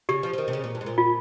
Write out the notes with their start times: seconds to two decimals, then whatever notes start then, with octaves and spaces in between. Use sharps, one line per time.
0.09 C#3 G4
0.23 F3
0.33 F3
0.38 D#3
0.48 C3
0.53 C#3
0.64 A#2
0.75 G2
0.81 G#2
0.86 A#2
0.98 F4